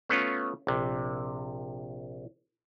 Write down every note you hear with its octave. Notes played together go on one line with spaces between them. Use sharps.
A3 B3 C#4 F4
A#1 C3